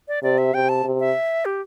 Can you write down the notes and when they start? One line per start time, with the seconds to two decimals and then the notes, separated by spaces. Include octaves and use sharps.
0.08 D5
0.23 C3 D5
0.38 E5
0.54 C3 G5
0.69 A5
0.84 C3
1.00 E5
1.45 G4